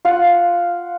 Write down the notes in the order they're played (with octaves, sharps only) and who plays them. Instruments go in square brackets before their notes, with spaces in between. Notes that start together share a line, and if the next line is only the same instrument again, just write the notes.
[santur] F4 F5 F#5